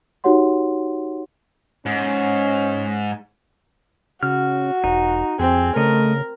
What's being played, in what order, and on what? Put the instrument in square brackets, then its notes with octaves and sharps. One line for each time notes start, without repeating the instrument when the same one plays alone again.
[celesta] D#4 F#4 G4 C#5 F#5 C6
[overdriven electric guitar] G#2 [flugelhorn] C#4
[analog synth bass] C#3 [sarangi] F#4 [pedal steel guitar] F6
[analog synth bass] E1 [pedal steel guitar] D#4
[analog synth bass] F2 [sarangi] C4 [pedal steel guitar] G#4
[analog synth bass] C#3 [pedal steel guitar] A3 D#5 [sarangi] A#4